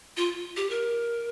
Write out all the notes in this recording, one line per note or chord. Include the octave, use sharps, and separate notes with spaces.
F4
G4
A#4